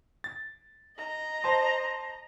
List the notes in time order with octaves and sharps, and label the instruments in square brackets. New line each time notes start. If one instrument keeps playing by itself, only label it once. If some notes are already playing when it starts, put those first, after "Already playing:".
[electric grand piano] A6
[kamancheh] D#5 A#5
[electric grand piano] C5 A5 C6